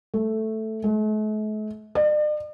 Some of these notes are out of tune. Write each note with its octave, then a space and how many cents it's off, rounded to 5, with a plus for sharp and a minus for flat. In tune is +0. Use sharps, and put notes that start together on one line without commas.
A3 +0
A3 -45
D5 +45